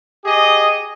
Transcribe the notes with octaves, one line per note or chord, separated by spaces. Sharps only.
G4 G#4 D#5